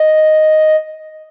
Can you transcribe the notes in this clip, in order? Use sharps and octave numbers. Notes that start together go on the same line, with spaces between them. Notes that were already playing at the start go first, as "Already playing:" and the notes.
Already playing: D#5